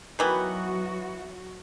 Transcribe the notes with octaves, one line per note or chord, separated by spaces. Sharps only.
D#3 E3 F#3 B3 F#4